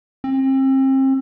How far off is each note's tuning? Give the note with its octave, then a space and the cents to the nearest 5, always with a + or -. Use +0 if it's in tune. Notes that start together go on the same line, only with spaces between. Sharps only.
C4 +35